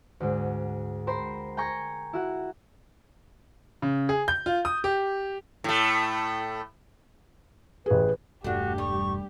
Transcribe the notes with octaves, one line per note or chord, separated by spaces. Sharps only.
D2 G#2
A#4 C5 G5 B5 C6
G5 G#5 A#5 C#6 G6
E4 F#4 F#5
C#3
G#4
G6
F4
D#6
G4
A2 A3
A1 G#4 B4
E1 G2 A3 D4 F#4 G4
G3 C#6